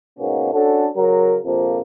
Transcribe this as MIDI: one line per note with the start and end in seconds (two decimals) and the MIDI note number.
0.19 0.51 44
0.19 0.51 47
0.19 0.51 58
0.19 0.51 59
0.19 0.51 61
0.53 0.88 61
0.53 0.88 62
0.53 0.88 66
0.53 0.88 69
0.96 1.38 49
0.96 1.38 54
0.96 1.38 70
1.44 1.80 34
1.44 1.80 41
1.44 1.80 48
1.44 1.80 53
1.44 1.80 58